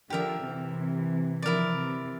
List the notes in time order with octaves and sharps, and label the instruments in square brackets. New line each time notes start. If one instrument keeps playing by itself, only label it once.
[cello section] D3 F3 [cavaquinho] G4 A#4 E5
[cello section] C3 E3
[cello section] D3 F3 [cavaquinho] E4 A#4 D5
[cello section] C3 E3